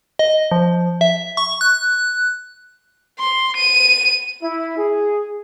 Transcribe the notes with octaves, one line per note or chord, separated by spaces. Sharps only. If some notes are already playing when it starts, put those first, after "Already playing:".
D#5
F3
E5
C#6
F#6
C6
D#7
E4
G#4